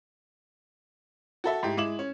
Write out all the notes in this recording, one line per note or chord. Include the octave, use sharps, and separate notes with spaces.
F#4 A4 E5
G#2 E4 G4
G#3 E4 D6 E7 F#7
C#4